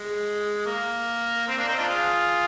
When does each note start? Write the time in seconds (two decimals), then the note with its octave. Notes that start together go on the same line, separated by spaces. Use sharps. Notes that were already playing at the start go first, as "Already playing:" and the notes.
Already playing: G#3
0.66 A#3
1.47 C4
1.58 A#3 D4
1.68 C4 D#4
1.78 D4 F4
1.88 F4 G#4